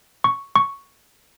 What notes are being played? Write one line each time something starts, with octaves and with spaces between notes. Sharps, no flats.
C#6
C#6